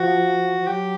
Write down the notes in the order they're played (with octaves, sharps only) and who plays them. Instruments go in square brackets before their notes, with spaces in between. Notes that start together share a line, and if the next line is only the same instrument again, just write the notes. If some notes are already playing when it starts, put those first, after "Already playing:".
Already playing: [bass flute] F3 [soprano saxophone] F#4
[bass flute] F3
[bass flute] F#3 [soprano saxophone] G4